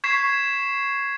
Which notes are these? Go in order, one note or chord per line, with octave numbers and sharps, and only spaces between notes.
C#6 G#6 B6 C7 E7